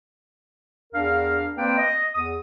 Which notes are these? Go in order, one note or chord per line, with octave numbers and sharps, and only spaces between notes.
E2 D4 A#4 F5
A#3 C4 B4 D5 G5
D#5
E2 D#6